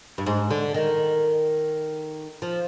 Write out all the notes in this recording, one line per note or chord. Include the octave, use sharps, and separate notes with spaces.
G2
G#2
D3
D#3
F3